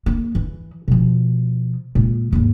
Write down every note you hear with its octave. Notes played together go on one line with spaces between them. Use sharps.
A#3
E3
B2 F3
A#2 G#3
D#2 G#2